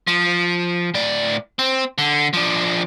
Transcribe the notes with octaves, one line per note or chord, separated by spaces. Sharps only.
F3
A2 D5
C4
D3
F3 D4